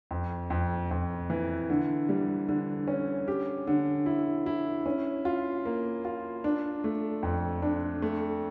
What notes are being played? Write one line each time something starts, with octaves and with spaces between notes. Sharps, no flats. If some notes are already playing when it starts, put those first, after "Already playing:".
F2
F2
F2
E3
D3
G3
D3
C#4
G4
D3
E4
E4
C#4
F4
A#3
F4
D4
A3
F2
D4
A3